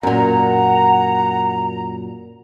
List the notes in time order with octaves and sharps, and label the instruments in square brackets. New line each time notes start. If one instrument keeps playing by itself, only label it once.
[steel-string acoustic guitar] F#2 A#2 [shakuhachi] F#5 [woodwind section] A#5